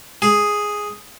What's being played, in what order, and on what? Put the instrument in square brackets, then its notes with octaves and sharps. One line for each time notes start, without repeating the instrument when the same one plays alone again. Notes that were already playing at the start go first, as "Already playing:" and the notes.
[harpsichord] G#4